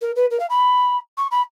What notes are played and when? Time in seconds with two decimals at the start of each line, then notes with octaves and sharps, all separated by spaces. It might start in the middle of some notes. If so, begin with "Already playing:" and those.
0.01 A#4
0.15 B4
0.30 A#4
0.39 F5
0.49 B5
1.17 C#6
1.31 B5